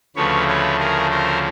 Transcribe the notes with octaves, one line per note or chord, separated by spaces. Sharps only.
D2 C#3 F3 A3 B4 C#5
B4 C#5
G#4 A#4
A#4 C5